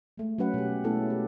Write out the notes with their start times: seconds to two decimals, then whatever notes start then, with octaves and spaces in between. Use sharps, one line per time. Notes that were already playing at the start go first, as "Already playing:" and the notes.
0.17 G#3 A3
0.38 F#3 C#4 B4 F#5
0.54 B2 G4
0.84 G#3 A3 B3 E4 A4
1.10 G4